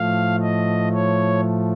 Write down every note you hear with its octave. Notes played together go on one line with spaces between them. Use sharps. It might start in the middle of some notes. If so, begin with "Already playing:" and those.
Already playing: A2 F3 A3 F5
D#5
C#5